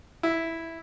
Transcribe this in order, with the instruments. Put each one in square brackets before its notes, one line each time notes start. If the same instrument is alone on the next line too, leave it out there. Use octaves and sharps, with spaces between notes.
[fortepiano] E4